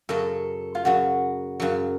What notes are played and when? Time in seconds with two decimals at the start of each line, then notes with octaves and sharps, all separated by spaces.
0.09 F#2 C#3 F#3 A4
0.75 F4
0.85 F#2 C#3 F#3 F#4
1.60 F#2 C#3 F#3